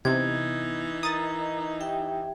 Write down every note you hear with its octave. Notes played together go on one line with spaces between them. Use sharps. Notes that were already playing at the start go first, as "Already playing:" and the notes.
C3 E3 B3 D#4 G#6
A#4 A#5 D#6 A6
G4 E5 G5